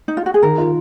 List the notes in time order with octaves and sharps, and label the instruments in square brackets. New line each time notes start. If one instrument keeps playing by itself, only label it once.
[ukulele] D#4
F4
F#4
G#4
[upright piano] D#3 [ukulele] A#4
[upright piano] F4